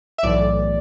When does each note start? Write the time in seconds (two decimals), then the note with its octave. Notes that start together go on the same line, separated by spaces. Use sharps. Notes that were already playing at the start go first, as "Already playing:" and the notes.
0.18 E5
0.23 B1 A2 E3 D5